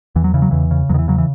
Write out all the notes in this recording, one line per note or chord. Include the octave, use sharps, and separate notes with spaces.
E2 E3
F#3
C#3 E3
F#3
E2 E3
C#3
E2 D#3 F#3
E3
C#3 F#3
E3